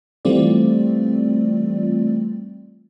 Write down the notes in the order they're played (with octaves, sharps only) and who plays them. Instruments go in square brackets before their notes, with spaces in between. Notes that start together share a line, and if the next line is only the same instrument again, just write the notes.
[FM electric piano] E3 G3 A3 C4 F4 D5